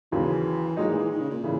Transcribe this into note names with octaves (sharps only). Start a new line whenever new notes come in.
D#2 C#3 E3 F#3
A#2 F#3 G#3 D#4
E3
E3
D#3
C#3
A#2
C#3 E3